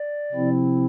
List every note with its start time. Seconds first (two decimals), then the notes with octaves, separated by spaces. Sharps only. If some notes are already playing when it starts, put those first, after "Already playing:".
Already playing: D5
0.32 C3 F3 C4 E4